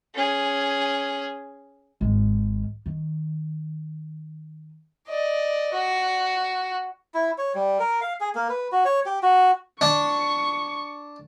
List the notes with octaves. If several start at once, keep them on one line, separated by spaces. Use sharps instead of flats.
C#4 G#4
G#1 G#3
D#3
D5 D#5
F#4
E4
C#5
G3
A#4
F5
G#4
A#3
B4
F#4
C#5
G4
F#4
D4 C#6